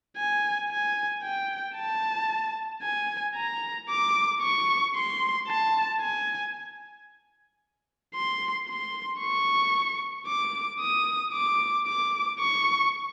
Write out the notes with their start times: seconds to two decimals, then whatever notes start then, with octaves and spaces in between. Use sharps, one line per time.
0.17 G#5
0.70 G#5
1.23 G5
1.76 A5
2.83 G#5
3.36 A#5
3.89 D6
4.42 C#6
4.96 C6
5.48 A5
6.01 G#5
8.15 C6
8.68 C6
9.21 C#6
10.27 D6
10.80 D#6
11.34 D6
11.87 D6
12.40 C#6